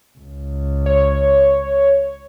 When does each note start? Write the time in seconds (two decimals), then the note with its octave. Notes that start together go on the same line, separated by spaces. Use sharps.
0.19 C#2
0.86 C#5